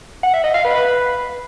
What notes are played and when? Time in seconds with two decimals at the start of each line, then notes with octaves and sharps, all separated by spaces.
0.23 F#5
0.34 E5
0.44 D#5
0.54 F5
0.65 B4